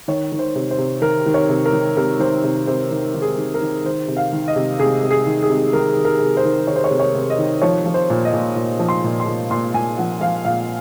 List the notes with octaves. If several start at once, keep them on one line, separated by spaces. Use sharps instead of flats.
D#3 C#5
D#3
C5
C3
C5
C3
D#3 A#4
D#3
C#5
C3
A#4
D#3
C3 A#4
D#3 C5
C3
C3 C5
D#3
D#3
G#4
D#3
A#4
D#3
D#3 C5
C3
F5
D#3
D#5
C3
C3 G#4
C3
G#4
D#3
G#4
C3
D#3 A#4
D#3
A#4
C3
C5
D#3
D#3 C#5
C5
C#5
C3
C#5
C3
D#5
D#3
F3 C#5
F3
C5
A#2
D#5
A#2
A#2
F3
C6
A#2
C6
A#2
A#2 C6
A#2 G#5
F3 F#5
F3 F5
A#2 F5